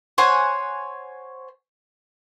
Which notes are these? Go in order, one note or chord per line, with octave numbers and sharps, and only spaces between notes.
C5 C#5 F#5 G#5